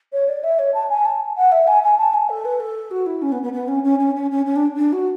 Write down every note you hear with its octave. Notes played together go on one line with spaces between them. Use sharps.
C#5
D5
E5
C#5
A5
G#5
A5
F#5
E5
G#5
G#5
A5
G#5
A4
B4
A4
F#4
E4
C#4
B3
B3
B3
C#4
C#4
C#4
C#4
C#4
C#4
D4
D4
F#4